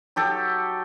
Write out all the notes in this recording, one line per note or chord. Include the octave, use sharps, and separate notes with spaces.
F#3 G4 A4